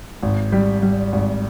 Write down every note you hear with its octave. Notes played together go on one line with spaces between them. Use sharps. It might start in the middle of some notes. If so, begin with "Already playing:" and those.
G#1
G3
G3
G#1